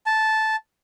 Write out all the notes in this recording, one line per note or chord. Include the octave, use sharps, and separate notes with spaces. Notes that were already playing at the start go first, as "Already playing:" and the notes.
A5